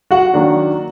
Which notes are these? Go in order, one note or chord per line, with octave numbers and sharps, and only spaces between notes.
F#4 F#5
D#3 F#3 A#3 D4